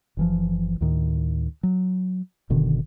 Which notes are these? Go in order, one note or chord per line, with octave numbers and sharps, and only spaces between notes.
F#1 E3 F3
D2 A2 D#3
F#3
F#1 B2 D3 D#3